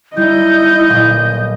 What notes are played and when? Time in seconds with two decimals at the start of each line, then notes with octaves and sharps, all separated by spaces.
0.17 G3 D#4 E4 D#5 G6
0.89 B1 A#2 G3